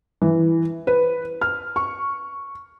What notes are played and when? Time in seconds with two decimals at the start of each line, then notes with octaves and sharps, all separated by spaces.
0.22 E3
0.87 B4
1.41 F6
1.76 C#6